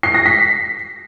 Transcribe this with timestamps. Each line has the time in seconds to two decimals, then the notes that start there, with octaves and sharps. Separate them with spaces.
0.03 C7
0.14 A#6
0.26 B6